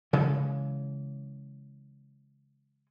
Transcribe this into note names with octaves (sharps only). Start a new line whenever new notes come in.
C#3 E3 G#3